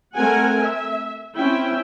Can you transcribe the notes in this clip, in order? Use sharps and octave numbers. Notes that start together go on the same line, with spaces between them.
A3 C4 A#4 F#5 G#5
E5
C4 C#4 E4 E5 G5